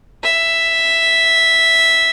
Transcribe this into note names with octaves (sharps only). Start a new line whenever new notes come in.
E5